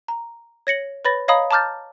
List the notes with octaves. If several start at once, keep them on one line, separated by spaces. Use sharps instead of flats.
A#5
C#5 A#6 C#7 F#7
B4 C#5 B5 A6 A#6
C#5 D#5 F5 A#5 B5 D#6
A5 A#5 D6 F6 G6 A6